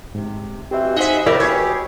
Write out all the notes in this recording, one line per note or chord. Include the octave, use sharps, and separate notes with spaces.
G#2 C3
B2 E3 C4 G4 E5
D#4 G#4 C5 D#5 E5 F#5 B5
E2 E4 G4 A#4 D5 E6
B2 G4 G#4 B4 C#5